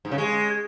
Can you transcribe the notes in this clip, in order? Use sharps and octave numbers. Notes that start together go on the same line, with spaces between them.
G#2
C#3
G#3